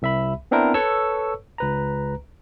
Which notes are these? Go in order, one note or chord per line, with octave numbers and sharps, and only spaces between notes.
C2 E5 B5
B3 C4 D4 E4 A#4 C5
A4 B4 C#5 C#6 E6
C#2 B4 A#5